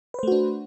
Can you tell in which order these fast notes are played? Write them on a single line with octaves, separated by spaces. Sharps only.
B4 C5 A3 F#4 D4